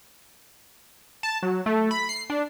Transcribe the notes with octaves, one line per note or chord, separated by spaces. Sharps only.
A5
F#3
A3
B5
C7
D4